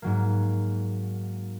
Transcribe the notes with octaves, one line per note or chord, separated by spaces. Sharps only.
G#2 F#3 A#3